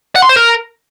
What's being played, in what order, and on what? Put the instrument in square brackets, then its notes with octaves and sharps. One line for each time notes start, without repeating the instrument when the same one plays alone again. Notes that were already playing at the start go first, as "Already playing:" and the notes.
[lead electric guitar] F#5
C6
C5
A#4